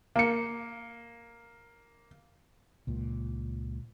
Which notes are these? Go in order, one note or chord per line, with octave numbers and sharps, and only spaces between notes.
A#3 C#7
C#2 A#2